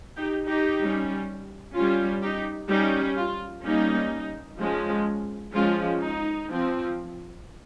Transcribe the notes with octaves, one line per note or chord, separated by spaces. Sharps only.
D#4 G4
D#4 G4
G3 C#4
G3 C#4 F4
D#4 G4
G3 C#4 D#4 G4
F4
G3 A#3 C#4 D#4
F3 G#3 C#4
F3 G#3 C#4 F4
D#4
F3 C4